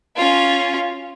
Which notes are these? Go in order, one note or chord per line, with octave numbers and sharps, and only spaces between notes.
C#4 F4